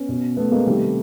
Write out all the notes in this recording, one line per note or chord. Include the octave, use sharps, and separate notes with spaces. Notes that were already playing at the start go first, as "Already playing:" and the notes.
Already playing: B3 C#4
B2
A3 B3
G#3 A#3
C3 D#3 G3 A3